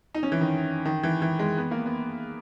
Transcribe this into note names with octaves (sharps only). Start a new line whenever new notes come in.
D#4
C#4
E3
D#3
D#3
E3
E3
G#3
B3
A#3
B3